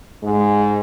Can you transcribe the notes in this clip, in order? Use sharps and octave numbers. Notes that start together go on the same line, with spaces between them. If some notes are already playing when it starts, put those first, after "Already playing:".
G#2 G#3